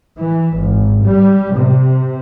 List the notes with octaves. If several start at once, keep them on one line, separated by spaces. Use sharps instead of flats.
E3
G#1
G3
C3